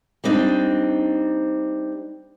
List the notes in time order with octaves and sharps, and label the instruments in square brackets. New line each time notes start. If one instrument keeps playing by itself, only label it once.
[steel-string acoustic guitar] G3 A#3 C4 D4 D#4